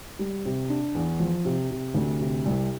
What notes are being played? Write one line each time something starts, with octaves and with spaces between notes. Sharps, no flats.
G3
C3
D4
E2
F3
C3
C3
D2
C3
C2